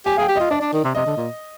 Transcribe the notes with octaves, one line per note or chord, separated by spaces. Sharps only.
G4 G#5
G#4 F5 G5
G4
F4 D#5
D4 D5
D4
D#3
C3
C3 D#5
D3
A#2